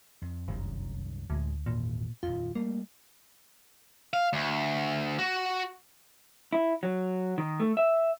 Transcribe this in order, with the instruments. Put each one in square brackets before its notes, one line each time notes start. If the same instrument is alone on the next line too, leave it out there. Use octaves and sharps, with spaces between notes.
[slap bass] F2
[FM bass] F1 [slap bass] C2 F#2 D#3
[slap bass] D1 G#3 [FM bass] D2
[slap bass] G#1 E2 [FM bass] A#2
[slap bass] D#1 F2 [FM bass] F4
[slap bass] G3 A3 [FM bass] A#3
[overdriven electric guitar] F5
D2
F#4
[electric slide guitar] E4
F#3
D#3
A3
E5